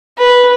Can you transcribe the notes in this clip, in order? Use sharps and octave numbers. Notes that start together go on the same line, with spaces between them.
B4